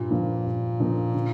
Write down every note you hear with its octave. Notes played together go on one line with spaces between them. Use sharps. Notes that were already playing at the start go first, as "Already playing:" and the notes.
Already playing: G2 A#2
D3 F3 A#3 D#4
G2
D3 F3 A#3 D#4
D3